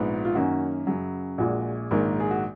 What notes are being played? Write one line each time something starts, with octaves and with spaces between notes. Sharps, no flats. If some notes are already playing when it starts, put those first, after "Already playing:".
Already playing: A#1 G#2 F3 B3
F4
F#2 D#3 A#3 C#4 F#4
F#2 C#3 F#3
A#1 A#2 G#3 F#4
A#1 G#2 D#3 A#3
G#4
F#4